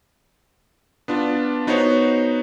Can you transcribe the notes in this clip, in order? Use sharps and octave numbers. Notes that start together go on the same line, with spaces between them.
B3 D4 F4
B3 D#4 F#4 C5 C#5